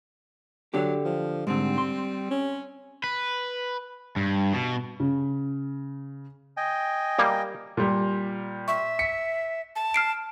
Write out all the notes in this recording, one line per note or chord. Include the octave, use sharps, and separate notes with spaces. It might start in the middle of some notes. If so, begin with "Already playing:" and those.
D3 F#3 D4 G4
F3
G#2 D3 G3 C4
C6
C#4
B4
G2
B2
C#3
D#5 G5 G#5
G3 A#3
A#2 G3
E5 C#6
B6 C#7
A5
F6 C7 D7